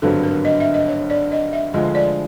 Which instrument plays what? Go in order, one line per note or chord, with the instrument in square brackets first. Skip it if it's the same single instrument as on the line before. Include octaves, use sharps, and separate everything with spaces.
[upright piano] G#1 G2 D3 F#3 B3 [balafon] A4
[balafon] A#4
D#5
E5
D#5
C#5
D5
D#5
E5
[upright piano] D2 D3 F3 G#3 [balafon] D#5
[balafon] D5